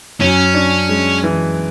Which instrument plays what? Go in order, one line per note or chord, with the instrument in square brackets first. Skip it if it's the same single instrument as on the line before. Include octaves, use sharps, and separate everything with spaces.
[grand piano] F#2 [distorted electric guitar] C#4
[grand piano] D4
G#3
E3